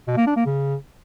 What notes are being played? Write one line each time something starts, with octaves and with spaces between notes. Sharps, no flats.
B2
A#3
D4
A#3
C#3